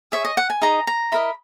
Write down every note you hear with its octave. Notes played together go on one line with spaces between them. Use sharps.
G#4 C#5 E5
D#5
F#5
G#5
D#4 G#4 D#5 A#5
A#5
E4 A#4 D#5 B5